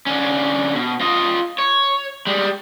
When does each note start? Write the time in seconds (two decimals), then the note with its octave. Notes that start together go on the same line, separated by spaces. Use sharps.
0.06 D3 C#4
0.75 B2
1.01 F4 D#5
1.58 C#5
2.27 G3 G#3